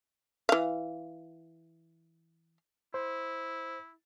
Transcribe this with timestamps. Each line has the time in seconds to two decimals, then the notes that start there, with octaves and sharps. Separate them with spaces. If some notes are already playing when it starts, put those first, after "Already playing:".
0.49 E3 F5
2.94 E4 C5